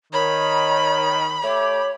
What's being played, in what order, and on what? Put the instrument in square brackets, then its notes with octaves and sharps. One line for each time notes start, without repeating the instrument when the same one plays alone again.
[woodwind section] D#3 [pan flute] C#5 [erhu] B5
[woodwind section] A3 G4 D6 [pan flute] C#5